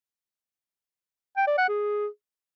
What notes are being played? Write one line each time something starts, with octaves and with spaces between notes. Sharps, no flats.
G5
D5
F#5
G#4